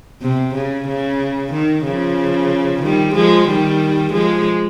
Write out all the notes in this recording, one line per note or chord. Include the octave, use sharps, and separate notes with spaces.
C3
C#3
C#3
D#3
C#3 F3
D#3 G3
F3 G#3
D#3 G3
F3 G#3